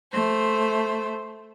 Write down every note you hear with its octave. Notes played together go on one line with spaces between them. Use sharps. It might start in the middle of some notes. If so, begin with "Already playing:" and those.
A3 C5